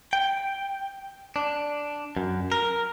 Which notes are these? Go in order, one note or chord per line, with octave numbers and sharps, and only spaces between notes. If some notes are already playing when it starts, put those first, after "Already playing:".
G5
D4
F#2
A#4